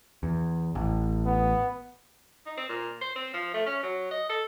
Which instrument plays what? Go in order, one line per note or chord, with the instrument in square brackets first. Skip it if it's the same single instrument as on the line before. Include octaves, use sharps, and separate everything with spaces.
[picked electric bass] E2
A1
[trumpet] B3
[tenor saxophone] D#4
C4
A#2
C5
C4
F3
A3
C#4
F#3
D#5
A4